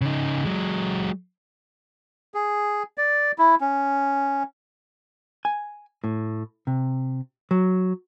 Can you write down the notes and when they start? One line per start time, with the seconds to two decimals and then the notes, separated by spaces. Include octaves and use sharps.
0.01 C#3 D#4
0.45 F#3 G#3
2.34 G#4
2.98 D5
3.38 E4
3.61 C#4
5.45 G#5
6.04 A2
6.67 C3
7.51 F#3